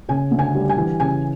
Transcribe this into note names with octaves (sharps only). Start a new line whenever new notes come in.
C#3 G#5
D2
G#5
G3
G#5
E3
C#3 G#5